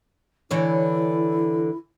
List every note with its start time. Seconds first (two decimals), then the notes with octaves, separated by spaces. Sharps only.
0.51 D3 E3 E4 C#5